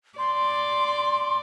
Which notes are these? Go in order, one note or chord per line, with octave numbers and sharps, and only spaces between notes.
D5 C6